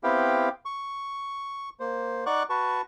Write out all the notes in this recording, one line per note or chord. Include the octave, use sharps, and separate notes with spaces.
B3 C4 E4 G4 F5 G5
C#6
A#3 C5
D#4 D5 F#5 C#6 D6 F#6
F#4 B4 A5 C#6